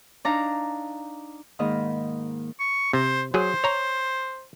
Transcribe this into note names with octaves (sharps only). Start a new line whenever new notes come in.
D4 D#4 F5 A#5
G#2 D#3 A#3 A#4 D#5 B5
C#6
C3 C5
F#3 G#4 C5
C#5 A#5